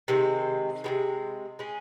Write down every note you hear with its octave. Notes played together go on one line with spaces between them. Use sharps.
C3 D#3 G#3 C4
C3 D#3 G#3
G#3 C#4 G#4